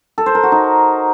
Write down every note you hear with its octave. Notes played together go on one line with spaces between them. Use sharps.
A4
C5
A#4
F#4
D#4